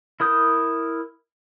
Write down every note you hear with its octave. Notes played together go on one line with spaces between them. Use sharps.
E4 A#4 D#6 G6